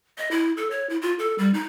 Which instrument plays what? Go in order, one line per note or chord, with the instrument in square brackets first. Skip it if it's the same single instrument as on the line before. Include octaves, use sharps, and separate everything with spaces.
[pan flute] D#5
E4
A4
C#5
E4
F4
A4
G3
D#4